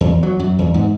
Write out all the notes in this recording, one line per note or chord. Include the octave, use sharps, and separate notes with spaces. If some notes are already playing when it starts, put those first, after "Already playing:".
E2
F#3
F#2
E2
G#2